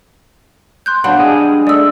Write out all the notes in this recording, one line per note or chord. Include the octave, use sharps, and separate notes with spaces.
C6 F#6 G6
F#3 B3 D4 F5 F#5 B5
G3 G#3 G#4
G#3 A3 D5 D#6 E6